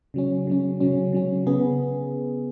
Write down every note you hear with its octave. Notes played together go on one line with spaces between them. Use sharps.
C#3 F#3 C#4
C#3 F#3 C#4
C#3 F#3 C#4
C#3 F#3 C#4
C#3 B3 G#4